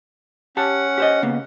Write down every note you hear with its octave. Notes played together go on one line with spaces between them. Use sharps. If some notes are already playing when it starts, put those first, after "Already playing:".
C#4 G4 F#5 A5
G4 C5 D#5
C#3 A#3 B3